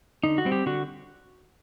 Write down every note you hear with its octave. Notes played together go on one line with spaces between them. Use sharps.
D3 D#4
F#4
G3 C4
G4
D3 F#4